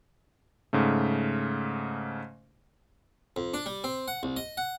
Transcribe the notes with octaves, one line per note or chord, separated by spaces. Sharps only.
G#2 C#3 A3
F2
D4
G3
C4
F#5
C2
D#5
F#5